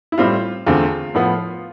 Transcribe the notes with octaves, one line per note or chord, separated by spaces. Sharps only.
E4
A2 G3 C4 F4
E2 D3 A3 C4 F4
A2 F3 B3